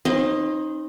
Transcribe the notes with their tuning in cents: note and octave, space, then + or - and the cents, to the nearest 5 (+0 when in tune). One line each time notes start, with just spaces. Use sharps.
C4 +45 D#4 +0 C5 -25